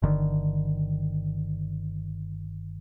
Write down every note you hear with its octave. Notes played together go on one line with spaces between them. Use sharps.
G1 D3 D#3